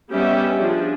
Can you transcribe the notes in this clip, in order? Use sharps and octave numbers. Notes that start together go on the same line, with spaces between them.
G3 B3 C#4 G4 D#5 E5
F3 D4 G#4